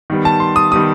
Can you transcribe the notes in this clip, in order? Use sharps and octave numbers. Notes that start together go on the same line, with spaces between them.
D#3 G3 B3
A5
C6
D#6
D#3 G3 B3 D#6